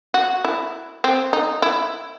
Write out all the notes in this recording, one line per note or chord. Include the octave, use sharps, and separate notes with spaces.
F#4
E4
C4
D#4
E4